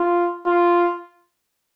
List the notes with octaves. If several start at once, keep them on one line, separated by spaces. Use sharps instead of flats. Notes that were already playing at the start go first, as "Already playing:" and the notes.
Already playing: F4
F4